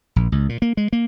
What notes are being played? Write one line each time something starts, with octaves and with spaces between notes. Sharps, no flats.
A#1
C#2
A#2
A#3
G#3
A#3